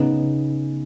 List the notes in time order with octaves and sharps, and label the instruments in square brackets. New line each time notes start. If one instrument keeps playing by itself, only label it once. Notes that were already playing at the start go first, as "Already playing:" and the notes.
Already playing: [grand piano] C#3 B3 D#4